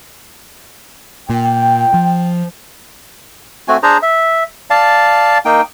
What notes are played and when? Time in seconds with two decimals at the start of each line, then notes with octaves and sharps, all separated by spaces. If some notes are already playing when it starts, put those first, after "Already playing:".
1.30 A#2 G5
1.94 F3
3.68 A3 C4 F#4 G#5
3.83 D4 G#4 C5 A#5
4.02 E5
4.70 D5 F5 A5
5.45 A#3 D#4 G5